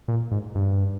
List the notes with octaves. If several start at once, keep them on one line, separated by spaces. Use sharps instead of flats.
A#2
G#2
G2